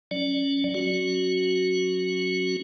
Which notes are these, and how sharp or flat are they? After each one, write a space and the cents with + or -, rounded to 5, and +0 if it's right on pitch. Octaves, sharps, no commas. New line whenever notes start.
F#3 +0 C#4 +0 D5 +0
F#3 -15 C#4 -20 F#4 +0